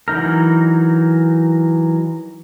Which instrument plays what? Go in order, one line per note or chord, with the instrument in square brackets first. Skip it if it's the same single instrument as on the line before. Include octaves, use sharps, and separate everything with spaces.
[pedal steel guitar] E3 F#3 D#4 A#4